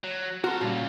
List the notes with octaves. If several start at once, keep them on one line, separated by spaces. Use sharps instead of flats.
F#3
F#4 A4 A#4 C6
A#2 C#3 G3 F4